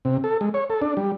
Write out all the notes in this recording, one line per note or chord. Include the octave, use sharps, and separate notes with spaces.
C3
A4
G#3
C#5
A4
D4
G3